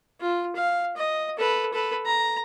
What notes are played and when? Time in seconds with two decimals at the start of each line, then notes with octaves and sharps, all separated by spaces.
0.21 F4
0.56 F5
0.96 D#5
1.38 A4 B4
1.73 A4 B4
2.06 A#5